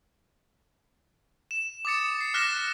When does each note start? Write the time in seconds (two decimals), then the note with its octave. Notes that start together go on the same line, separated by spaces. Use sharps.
1.51 E7
1.85 D6 D#6 A6 C#7
2.21 C7
2.34 D6 F6 F#6 A#6 B6 E7